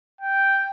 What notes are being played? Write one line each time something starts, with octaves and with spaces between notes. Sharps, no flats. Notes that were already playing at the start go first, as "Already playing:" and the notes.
G5